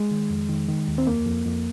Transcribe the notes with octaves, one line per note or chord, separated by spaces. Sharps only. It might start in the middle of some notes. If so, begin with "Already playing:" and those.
Already playing: G#3
D#3
F2
D#3
D#3
D#2
C4
F2 A#3
F2
F2